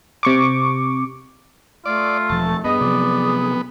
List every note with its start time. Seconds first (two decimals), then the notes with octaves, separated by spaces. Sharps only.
0.23 C3 C#6 D6
1.86 A3 F4 D5
2.30 E1 F3 A5
2.65 G2 B3 G#4 D#5
2.81 C3 F3 F#3 D5